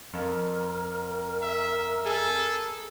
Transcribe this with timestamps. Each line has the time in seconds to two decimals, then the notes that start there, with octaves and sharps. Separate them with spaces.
0.14 F2 A#4
1.42 E5
2.06 G#4 A4